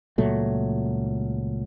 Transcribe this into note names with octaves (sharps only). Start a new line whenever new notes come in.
C#2 A#2 F#3 A3